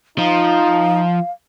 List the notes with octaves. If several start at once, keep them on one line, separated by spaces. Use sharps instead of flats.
F3 D#4 F5